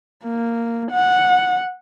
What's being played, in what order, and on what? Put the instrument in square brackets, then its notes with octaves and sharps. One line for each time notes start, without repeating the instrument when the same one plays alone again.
[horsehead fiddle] A#3
F#5